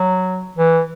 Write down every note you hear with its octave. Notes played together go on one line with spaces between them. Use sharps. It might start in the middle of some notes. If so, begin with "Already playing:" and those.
Already playing: F#3
E3